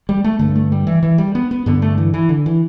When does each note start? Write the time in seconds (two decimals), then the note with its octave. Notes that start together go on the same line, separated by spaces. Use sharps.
0.09 G3
0.24 A3
0.39 G2 D3 A3
0.56 A3
0.72 G3
0.87 E3
1.03 E3
1.18 G3
1.35 B3
1.51 B3
1.66 G2 D3 B3
1.82 A3
1.98 E3
2.14 E3
2.29 D3
2.46 E3